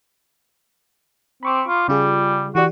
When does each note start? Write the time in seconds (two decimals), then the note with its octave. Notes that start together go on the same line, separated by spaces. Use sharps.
1.43 C4 B5 C#6 D6
1.68 F4
1.88 C#3 G3 F4 G#4
2.55 E3 F#4 G4 D5